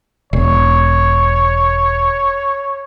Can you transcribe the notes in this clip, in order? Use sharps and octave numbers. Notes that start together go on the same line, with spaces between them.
E1 C#5